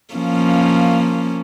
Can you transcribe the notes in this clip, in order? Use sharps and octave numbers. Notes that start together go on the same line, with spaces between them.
F3 A#3 C#4